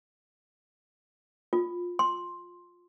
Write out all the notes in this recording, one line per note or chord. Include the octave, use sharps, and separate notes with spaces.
F4
C6